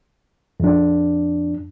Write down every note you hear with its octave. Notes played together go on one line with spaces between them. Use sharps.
F2 D4